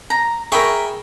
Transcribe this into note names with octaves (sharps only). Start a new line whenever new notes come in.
A#5
G#4 A#4 E5 G5 B5 C#6